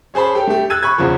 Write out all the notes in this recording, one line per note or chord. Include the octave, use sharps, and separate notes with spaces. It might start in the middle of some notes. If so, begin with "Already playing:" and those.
C#4 G#4 C5 A5 B5
G4 A4 G5
A3 G4
E6 F#6 G#6 A6 D#7
B5 C#6 F#6 G#6
E2 C#3 F3